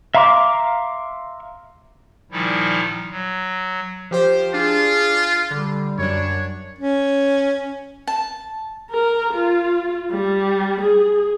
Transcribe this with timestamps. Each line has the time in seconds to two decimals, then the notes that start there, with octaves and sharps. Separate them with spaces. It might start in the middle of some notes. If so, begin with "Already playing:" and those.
0.15 E5 F5 A#5 C6 D6
2.32 A#2 D#3 F3 G3 D#4 E4
3.10 F#3
4.11 F3 G4 C5
4.54 D4 F4 G#4
5.51 D3 G3
5.99 F#2 D4 C#5
6.78 C#4
8.08 A5
8.91 A#4
9.33 F4
10.12 G3
10.81 G#4